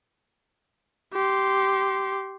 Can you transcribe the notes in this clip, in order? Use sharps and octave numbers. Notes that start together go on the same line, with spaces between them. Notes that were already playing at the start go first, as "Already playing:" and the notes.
G4 C6